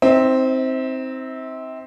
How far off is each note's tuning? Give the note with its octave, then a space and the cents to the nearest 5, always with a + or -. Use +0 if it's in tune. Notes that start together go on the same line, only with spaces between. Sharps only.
C4 +0 D#4 +30 E5 -40